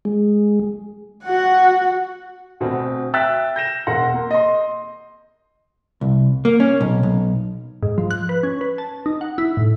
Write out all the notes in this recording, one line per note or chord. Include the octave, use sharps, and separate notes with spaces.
G#3
F#4 F#5
D2 B2 C4
E5 G5 E6 F#6 A6 B6
G6 A#6 E7
E1 F#5 C6 A#6
A#3
D#5 C6
C2
A#3
C#4
B1
B1
G#2
F3
F#6
B4
C#4
B4
A5
D#4
F#5
E4
A2